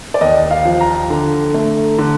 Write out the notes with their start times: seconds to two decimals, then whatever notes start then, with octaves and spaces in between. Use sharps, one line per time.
0.14 D5
0.21 D#2 D#5
0.51 F5
0.65 F3
0.81 A#5
1.10 D3
1.54 A3
1.98 D3